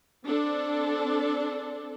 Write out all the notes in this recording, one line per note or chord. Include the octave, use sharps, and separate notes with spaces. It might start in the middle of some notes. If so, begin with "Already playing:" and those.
C4 D4 A4